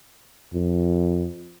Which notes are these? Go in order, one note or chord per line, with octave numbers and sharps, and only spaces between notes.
F2